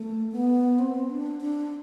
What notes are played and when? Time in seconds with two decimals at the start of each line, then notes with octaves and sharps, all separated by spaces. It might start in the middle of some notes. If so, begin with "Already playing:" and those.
Already playing: A3
0.32 B3
0.79 C4
1.10 D4
1.41 D4